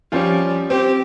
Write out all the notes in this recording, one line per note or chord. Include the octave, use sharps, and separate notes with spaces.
F3 G3 C#4 F4
C4 G4